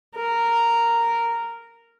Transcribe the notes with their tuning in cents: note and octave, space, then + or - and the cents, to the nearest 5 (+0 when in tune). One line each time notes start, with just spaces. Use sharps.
A#4 -5